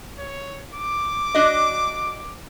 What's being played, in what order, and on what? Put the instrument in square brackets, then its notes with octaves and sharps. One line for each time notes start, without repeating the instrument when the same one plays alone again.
[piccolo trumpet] C#5
D6
[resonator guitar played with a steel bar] D4 F#4 D#5